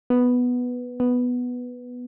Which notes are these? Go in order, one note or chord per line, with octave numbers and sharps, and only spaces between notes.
B3
B3